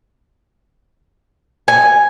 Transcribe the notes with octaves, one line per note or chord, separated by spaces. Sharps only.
G#5